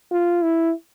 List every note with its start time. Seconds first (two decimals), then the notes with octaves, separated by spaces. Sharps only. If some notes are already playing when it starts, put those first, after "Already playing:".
0.12 F4
0.44 E4